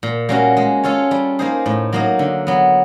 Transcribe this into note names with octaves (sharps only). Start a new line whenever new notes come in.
A#2
G3 A#3 C#4 F#4
G#3
C#4 F4 A4 C#5
G3
A#3 D#4 G#4 C5
A2
F#3 A#3 D#4
D3
F#3 B3